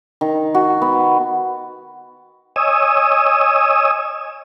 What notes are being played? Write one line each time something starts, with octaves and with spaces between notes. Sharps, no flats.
D#3
F#4
B3
C#5 D#5 G#5 D#6 E6